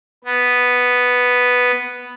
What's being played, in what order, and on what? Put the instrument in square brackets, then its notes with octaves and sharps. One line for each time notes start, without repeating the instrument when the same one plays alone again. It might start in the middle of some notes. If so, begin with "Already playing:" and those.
[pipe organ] B3